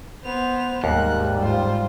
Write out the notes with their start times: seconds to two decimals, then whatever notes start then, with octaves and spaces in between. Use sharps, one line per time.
0.25 B3 C5 F7
0.84 D#2 G#2 G3 A#4 F#6
1.42 F4 C5